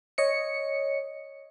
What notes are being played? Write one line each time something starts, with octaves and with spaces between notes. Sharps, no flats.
C#5 D#5 C#7